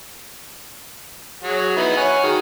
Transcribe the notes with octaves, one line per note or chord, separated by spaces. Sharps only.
F#3 F#4 G#4
B3 D#4 E4
C#5 F#5 G#5
D#3 F#4 G#4